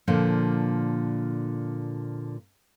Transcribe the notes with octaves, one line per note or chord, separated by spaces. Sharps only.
A#2 D3 F3